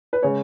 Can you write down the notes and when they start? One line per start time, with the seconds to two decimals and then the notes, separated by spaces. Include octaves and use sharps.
0.13 B4
0.22 C#3 G#3 C#5